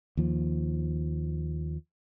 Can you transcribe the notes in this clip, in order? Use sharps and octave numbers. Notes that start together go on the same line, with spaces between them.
D#2 F3